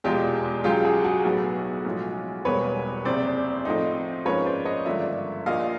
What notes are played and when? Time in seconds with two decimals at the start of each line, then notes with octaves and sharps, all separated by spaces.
0.04 F1 E2 B2 G#3 F4 G4
0.64 C#2 C#3 F#3 F4 G4
0.85 F#4 G#4
1.04 F#4 G#4
1.25 B1 A2 F#3 B3
1.85 B1 A2 F3 G#3
2.45 E1 E2 B2 G3 A#3 B4 C#5
3.05 F#1 E2 C3 C5 D5
3.65 A2 F3 A3 C4 D#4
4.25 G#2 F3 A#3 C#4 B4 C#5
4.46 C5 D5
4.65 C#5 D#5
4.86 G#1 G2 D3 F3 A#3 D5 E5
5.46 A#1 A#2 F3 A#3 D#5 F5